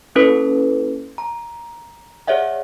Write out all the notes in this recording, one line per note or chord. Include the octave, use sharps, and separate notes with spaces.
A#3 C#4 E4 A4 B4
A#5
G#4 C#5 D5 E5 F#5